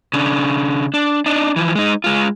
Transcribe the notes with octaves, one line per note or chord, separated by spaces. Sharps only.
C#3 D4
D4
D4 D#4
E3 F3
G#3 D#4
G#3 F4